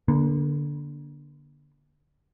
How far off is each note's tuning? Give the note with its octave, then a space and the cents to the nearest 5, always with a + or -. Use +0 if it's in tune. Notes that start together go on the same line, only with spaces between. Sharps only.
D3 -5 A#3 +35